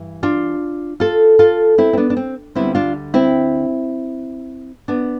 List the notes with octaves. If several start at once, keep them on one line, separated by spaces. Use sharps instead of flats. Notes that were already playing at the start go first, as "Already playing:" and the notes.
Already playing: G2 E3
D4 F4
F4 A4
F4 A4
C4 E4
C4
B3 D4
D4
C4
D2 D3 G3 B3 C4 E4
D4 F4
C4 E4
B3 D4